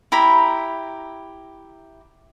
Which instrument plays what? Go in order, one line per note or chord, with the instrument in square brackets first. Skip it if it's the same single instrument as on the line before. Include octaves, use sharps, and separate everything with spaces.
[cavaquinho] E4 G4 A#5 B5